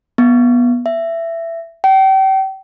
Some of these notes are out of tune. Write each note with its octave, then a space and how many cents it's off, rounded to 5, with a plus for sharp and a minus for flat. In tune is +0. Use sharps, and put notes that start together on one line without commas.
B3 -20
E5 +15
G5 -35